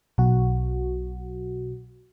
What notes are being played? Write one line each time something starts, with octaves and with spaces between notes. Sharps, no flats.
B1 F#4